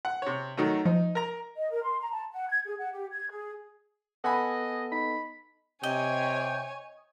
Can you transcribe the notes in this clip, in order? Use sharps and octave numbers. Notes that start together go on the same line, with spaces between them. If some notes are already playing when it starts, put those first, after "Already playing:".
F#5
C3 C#5
D#3 F#3 A3
F3 D#4
A#4 A#5
D#5
A#4
C6
A#5
A5
F#5
G#6
G#4
F#5
G4
G#6
G#4
B3 A4 D#5 F#5 G#5 B5
D#4 B5
C3 C#5 D#5 G5 G#5